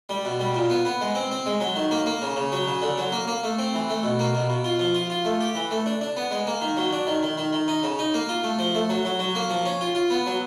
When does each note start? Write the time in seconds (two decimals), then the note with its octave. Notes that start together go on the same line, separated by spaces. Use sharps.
0.09 G3
0.25 B2
0.40 G3
0.55 A#2
0.70 B3
0.85 B3
1.01 G#3
1.15 C4
1.31 C4
1.46 G#3
1.61 F#3
1.76 D#3
1.91 A#3
2.06 A#3
2.22 C#3
2.36 C#3
2.52 F#3
2.68 C#3
2.82 D3
2.98 F#3
3.12 A#3
3.27 A#3
3.44 A3
3.58 C4
3.74 E3
3.89 A3
4.03 B2
4.19 A#3
4.35 B2
4.50 B2
4.64 F4
4.79 F3
4.95 F4
5.10 F4
5.25 A3
5.40 G4
5.55 E3
5.71 A3
5.86 D4
6.01 D4
6.17 B3
6.31 G#3
6.47 A#3
6.61 D#3
6.77 F#3
6.93 D4
7.07 D#3
7.23 D#3
7.38 D#3
7.53 D#3
7.68 D#4
7.83 C#3
7.99 D#4
8.14 A#3
8.29 F4
8.43 A3
8.59 F3
8.75 A3
8.90 F#3
9.05 F#3
9.19 F#3
9.35 A#3
9.50 F3
9.65 C#4
9.81 F4
9.95 F4
10.10 B3
10.26 F#3